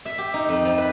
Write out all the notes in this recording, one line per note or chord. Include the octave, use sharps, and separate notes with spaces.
E5
G4
D#4
F2
F3
B4